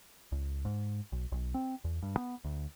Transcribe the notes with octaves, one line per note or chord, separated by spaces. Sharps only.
C#2
G#2
B1
B1
C4
E2
G2
B3
D2